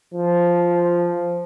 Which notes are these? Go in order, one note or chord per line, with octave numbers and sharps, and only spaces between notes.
F3